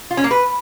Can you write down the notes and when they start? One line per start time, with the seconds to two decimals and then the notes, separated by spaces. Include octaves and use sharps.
0.11 F4
0.17 C#4
0.24 A#3
0.31 B4